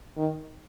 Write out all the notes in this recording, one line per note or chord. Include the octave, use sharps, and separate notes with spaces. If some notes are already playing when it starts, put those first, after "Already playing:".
D#3